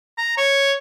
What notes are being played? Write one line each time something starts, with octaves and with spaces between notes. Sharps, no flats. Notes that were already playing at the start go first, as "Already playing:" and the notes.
A#5
C#5